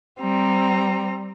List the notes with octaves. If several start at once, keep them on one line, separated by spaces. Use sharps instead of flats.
G3 C4 A#5